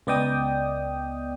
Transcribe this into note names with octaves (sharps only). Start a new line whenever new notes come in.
C#2 B3 D5 D#5 G5 D#6